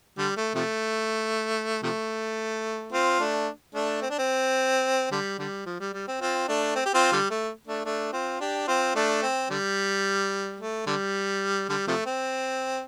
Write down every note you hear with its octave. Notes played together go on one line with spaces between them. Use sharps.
D3 G3
A3
C3 F3 A3
C3 F3 A3
C4 F4
A3 D4
A3 D4
C4
D4
C4
D3 G3
D3 G3
F3
G3
G3
C4
C4 F4
A3 D4
C4
G4
C4 F4
D3 G3
A3
A3 D4
A3 D4
C4 F4
D4 G4
C4 F4
A3 D4
C4
D3 G3
A3
D3 G3
D3 G3
C3 F3 A3
C4